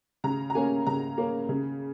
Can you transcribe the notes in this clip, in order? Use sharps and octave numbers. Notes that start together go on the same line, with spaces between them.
C#3 A#5
A#5
A#3 C#4 G#5
C#3 A#5
A#3 C#4
C#3